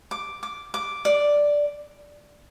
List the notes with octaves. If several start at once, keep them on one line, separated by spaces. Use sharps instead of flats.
D6
D6
D6
D5